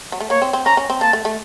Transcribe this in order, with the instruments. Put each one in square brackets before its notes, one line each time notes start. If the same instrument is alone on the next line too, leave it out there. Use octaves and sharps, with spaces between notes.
[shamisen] F#3
A3
[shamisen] A#3 [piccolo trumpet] C#5
[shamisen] C4
C4
[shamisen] C#4 [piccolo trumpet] A#5
[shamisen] C#4
C4
[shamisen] A#3 [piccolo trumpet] A5
[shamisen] A3
A3